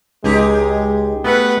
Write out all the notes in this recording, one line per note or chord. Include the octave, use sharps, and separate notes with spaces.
C#2 G#3 D#4 G4 G#4
A3 B3 B4 F#5